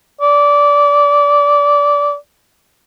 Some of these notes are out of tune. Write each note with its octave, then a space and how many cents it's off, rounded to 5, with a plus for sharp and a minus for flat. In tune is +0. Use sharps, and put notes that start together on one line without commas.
D5 -20